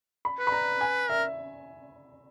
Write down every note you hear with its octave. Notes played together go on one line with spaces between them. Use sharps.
B5
B4
B5
A#5
G#5
A#4 E5